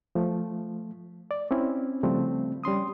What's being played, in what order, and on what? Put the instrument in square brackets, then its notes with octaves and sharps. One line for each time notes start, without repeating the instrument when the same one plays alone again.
[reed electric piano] F3 A3
D5
C4 C#4 E4
C#3 F3 G3 A3 C4
G3 C#4 C6 D#6